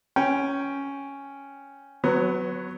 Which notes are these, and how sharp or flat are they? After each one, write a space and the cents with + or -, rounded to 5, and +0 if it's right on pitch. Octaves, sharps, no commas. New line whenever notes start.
C#4 +0 G5 +0
F#3 +0 B3 +20 C#5 -25